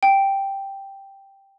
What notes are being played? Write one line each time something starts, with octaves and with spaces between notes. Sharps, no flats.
G5